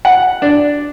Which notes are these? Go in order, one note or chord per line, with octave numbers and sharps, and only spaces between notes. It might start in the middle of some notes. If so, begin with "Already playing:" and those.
F#5
D4